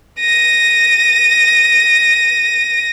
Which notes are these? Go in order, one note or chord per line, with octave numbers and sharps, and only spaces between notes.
A#6 D#7